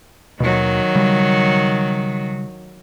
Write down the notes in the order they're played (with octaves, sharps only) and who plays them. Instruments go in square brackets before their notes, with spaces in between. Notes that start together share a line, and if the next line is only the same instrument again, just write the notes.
[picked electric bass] D#2 B2 [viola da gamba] D#3 F#3
[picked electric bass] C#3 G3